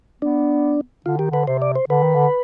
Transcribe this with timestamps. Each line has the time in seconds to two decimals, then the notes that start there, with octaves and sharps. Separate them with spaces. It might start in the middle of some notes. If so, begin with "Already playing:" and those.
0.21 B3 D4
1.06 D3 F4
1.18 D#3 G4
1.31 D3 B4
1.47 C3 C5
1.62 D5
1.75 C5
1.89 D3 B4
2.03 D#3
2.15 D3